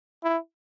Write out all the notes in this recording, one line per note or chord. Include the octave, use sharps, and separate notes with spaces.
E4